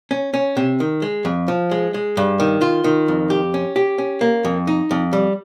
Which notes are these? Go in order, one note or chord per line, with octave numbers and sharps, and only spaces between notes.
C#4
C#4
C3
D#3
G#3
F2
F3
G#3
G#3
G2
D#3
F4
D#3
F2
G4
C#4
G4
C#4
A#3
F2
D#4
F2
G3